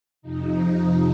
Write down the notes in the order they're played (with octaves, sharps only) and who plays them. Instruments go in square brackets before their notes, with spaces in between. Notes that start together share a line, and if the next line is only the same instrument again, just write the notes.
[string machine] F2 C3 F3 D#4